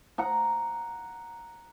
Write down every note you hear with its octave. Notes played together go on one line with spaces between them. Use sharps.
F#5 A#5